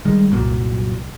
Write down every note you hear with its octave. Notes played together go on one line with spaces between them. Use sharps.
D#3 G3 G#3
C2 F#2 A#2 F#3